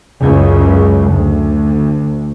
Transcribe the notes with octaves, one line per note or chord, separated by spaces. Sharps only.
C#2 F#2 C#3
D2